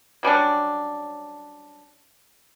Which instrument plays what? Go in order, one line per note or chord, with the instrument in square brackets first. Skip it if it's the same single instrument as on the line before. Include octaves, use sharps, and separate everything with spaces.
[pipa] F#3 G3 C#4 D4